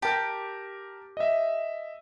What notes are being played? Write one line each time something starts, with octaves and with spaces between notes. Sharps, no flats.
G4 A#4 A5
D#5 E5